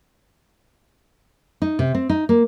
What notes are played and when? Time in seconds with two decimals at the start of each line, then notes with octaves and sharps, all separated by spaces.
1.62 D#4
1.79 C3
1.95 C4
2.09 D#4
2.29 A#3